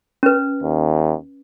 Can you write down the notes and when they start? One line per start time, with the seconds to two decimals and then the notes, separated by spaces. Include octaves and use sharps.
0.23 C#4 B4
0.63 D#2